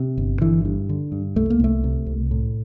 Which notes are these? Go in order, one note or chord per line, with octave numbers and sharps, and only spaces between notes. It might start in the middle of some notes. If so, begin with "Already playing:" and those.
Already playing: C3
G1
D3 E3
G2
D3
G2
C2 A3
A#3
C2 A3
C3
C2
A2